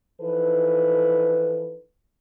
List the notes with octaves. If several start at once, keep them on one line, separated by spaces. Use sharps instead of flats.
E3 F3 D#4 A4 B4